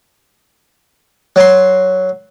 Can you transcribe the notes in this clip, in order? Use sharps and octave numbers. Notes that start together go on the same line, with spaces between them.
F#3 C6